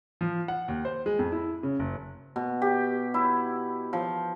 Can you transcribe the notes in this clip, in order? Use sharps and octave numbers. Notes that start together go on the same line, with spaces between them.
F3
F#5
D#2
C5
G#3
F2
E4
C#3
F#1
B2
G4
E4
F3